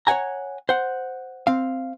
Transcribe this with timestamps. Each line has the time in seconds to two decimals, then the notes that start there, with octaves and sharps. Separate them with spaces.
0.07 C#5 D5 F#5 G#5 A#5
0.69 C5 F#5
1.47 C4 F5